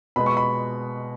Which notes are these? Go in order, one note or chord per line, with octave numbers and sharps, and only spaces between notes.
B2 G#3 B3 B5
C#6
B5